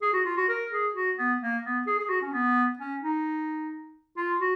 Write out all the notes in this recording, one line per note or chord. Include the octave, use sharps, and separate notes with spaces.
G#4
F#4
F4
F#4
A#4
G#4
F#4
B3
A#3
B3
G#4
G#4
F#4
C#4
B3
C#4
D#4
F4
F#4